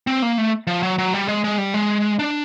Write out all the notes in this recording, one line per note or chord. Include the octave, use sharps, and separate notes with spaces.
C4
A#3
A3
F3
F#3
F#3
G3
G#3
G#3
G3
G#3
D4